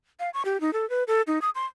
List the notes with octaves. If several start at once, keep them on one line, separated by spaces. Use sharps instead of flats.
F5
C#6
G4
D#4
A4
B4
A4
D#4
D#6
C6